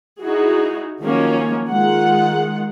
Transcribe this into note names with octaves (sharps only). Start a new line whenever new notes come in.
D#4 E4 F#4 G#4
D#3 F3 F#3 A#3 C#4
D#3 G#3 F4 F#5